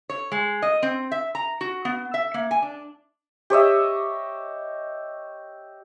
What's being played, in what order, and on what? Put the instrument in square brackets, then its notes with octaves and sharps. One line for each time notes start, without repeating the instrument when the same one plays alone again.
[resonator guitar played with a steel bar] C#5
G#3
D#5
C4
E5
A#5
F#4
B3
E5
A#3
G#5
D4
[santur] G4 C#5 D#5 E5